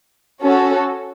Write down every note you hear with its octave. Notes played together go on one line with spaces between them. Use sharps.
C#4 F#4 A4